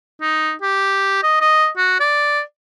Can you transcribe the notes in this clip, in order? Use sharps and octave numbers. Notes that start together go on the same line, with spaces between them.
D#4
G4
D#5
D#5
F#4
D5